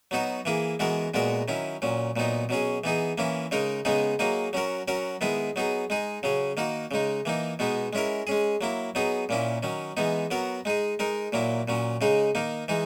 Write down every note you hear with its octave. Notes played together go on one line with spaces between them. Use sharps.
F#3 B3 D#4 F#4
E3 A#3 E4 G#4
E3 G#3 B3 F#4 A#4
A#2 G#3 B3 F#4 A#4
D#3 F#3 C#4 E4
A#2 F#3 C#4
A#2 F#3 B3 D#4
B2 F#3 C#4 G#4
E3 B3 D#4 G#4
E3 A#3 C#4 E4
C#3 G#3 D#4 A#4
C#3 G#3 B3 D#4 G#4
F#3 A#3 D#4 G#4
F#3 C#4 F#4 A#4
F#3 C#4 F#4 A#4
D#3 G#3 B3 E4 G#4
F#3 B3 D#4 G#4
G#3 D#4 G#4
C#3 F#3 C#4 G#4
D#3 A#3 D#4 F#4
C#3 G#3 D#4
E3 A#3 D#4
B2 G#3 B3 D#4
G#3 C#4 E4 A#4
G#3 C#4 G#4
F#3 A#3 E4
F#3 B3 D#4 G#4
A#2 A#3 C#4 E4
D#3 F#3 C#4
E3 G#3 B3 D#4
F#3 B3 F#4 A#4
G#3 D#4 G#4
G#3 D#4 A#4
A#2 F#3 A#3 E4
A#2 F#3 C#4
C#3 G#3 D#4 G#4
D#3 A#3 D#4
E3 G#3 D#4